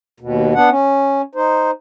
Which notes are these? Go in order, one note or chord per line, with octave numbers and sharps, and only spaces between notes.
D#2 B2
B3 D4 F#5
C#4
D#4 C5